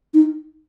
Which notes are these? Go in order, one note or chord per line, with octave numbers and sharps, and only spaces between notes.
D#4